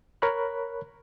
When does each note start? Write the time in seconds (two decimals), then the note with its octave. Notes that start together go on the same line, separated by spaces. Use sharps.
0.22 A#4 C#5 B5 F#6